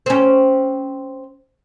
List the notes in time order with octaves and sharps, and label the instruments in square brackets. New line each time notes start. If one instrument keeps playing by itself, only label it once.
[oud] C4 C#4